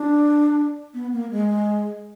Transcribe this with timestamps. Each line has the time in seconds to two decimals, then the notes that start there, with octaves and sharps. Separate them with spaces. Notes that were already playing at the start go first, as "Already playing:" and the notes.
Already playing: D4
0.94 B3
1.13 A#3
1.31 G#3